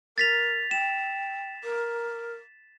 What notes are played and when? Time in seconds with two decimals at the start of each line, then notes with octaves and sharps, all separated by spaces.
0.18 A#4 A6 B6 F7
0.71 G5 E7
1.64 A#4